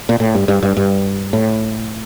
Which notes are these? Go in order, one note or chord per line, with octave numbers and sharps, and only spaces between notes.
A#2
A2
G2
G2
G2
G2
A2